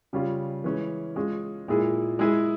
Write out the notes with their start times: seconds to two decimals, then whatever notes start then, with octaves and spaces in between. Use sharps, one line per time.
0.13 C#3 G3 C#4 F4
0.64 E3 G#3 C#4
1.16 G#3 C#4 F4
1.68 A#2 G#3 E4 G#4
2.19 G#3 E4 G#4